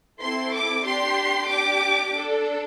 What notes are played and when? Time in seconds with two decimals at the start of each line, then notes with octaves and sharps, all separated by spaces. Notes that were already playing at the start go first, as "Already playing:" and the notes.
0.21 C4 E4 A4 C6
0.53 D6
0.84 D4 G4 C6
1.48 D4 G4 D6
2.12 D4 A4